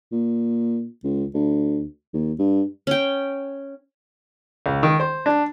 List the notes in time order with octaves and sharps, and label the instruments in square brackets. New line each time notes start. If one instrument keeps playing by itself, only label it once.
[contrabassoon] A#2
C#2
D2
D#2
G2
[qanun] C#4 G5
[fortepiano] C#2
D#3
C5
D4